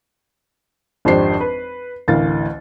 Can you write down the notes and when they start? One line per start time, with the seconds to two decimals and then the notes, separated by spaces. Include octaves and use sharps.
1.05 G#1 F2 D4 G4 C5 C7
1.40 B4
2.08 A1 D2 E3 A#4 F5 A6